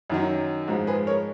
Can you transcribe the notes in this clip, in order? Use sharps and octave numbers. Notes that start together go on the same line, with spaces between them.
F#2 D#3 F#3
G#2 F3 G#3 F#4
G#4 B4
A#4 C#5